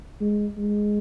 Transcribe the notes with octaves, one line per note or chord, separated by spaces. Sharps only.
G#3
G#3